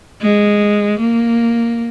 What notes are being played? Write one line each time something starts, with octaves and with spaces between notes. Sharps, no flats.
G#3
A#3